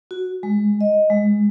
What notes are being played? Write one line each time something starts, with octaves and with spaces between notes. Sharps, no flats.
F#4
G#3
D#5
G#3